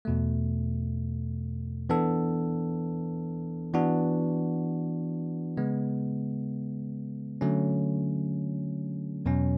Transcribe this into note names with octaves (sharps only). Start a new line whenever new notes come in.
E2 B2 A3
E3 B3 D4 A4
E3 B3 D4 F#4
C#3 G#3 B3
D3 F#3 A3 C#4
E2 B2 F#3 C#4